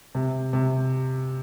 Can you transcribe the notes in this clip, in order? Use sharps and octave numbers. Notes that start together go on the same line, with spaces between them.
C3
C3